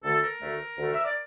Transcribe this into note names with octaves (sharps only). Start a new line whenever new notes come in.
D2 D3 A3 A4
A#4
D2 D3 A3
D2 D3 A3
E5
D5